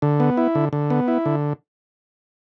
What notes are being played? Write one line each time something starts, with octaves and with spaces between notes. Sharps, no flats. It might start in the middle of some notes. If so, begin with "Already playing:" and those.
D3
B3
E4
D3
D3
B3
E4
D3